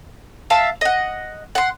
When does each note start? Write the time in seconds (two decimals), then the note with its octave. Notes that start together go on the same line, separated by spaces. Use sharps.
0.50 E5 F5 A5
0.81 D#5 F#5
1.55 F#5 C6